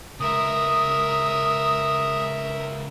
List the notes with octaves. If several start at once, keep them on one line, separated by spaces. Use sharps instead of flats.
C#2 A#4 E5 D#6